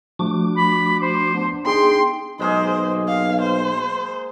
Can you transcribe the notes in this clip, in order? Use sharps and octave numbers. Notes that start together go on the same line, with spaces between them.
F3 A3 D4 F#4 D6
B5
C5
B3 D4
D#4 G#4 G5 C6
B1 G#3 A#3 G#4 C5
F5
C5